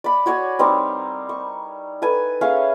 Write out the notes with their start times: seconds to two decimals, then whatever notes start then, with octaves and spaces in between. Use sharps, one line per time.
0.04 D5 B5
0.26 F#4 C#5 D5 G#5
0.59 G3 C4 D#4 A#4
1.29 C#6
2.02 A4 B4 G#5
2.41 C#4 G#4 E5 F5